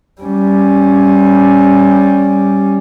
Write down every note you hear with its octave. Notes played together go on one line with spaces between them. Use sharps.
G3 C#4